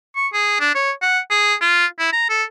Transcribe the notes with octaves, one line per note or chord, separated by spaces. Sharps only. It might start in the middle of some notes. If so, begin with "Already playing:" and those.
C#6
G#4
D4
C#5
F#5
G#4
F4
E4
A#5
A4